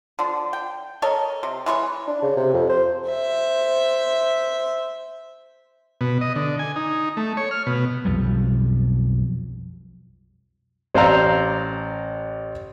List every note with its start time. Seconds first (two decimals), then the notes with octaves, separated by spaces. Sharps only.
0.19 D3 F3
0.53 G5
1.02 A4 A#4 C#5 D#5
1.43 C3
1.66 E3 G#3 E4 C#5
2.07 D4
2.22 C#3
2.37 C3
2.53 F2
2.69 C5
3.08 C5 E5
6.01 B2
6.21 D#5
6.36 D3
6.59 G#5
6.76 D#4
7.17 A3
7.37 C#5
7.51 F6
7.67 B2
8.05 B1 F2 F3 G3
10.94 A1 C5 D5 F5 A#5 E6